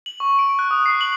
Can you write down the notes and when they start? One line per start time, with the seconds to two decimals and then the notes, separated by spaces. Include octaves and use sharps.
0.06 F#7
0.20 C#6
0.39 D7
0.59 F#6
0.71 D#6
0.86 C7
1.01 F#7